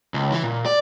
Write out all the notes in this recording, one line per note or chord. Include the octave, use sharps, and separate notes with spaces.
C#2
E3
A#2
D5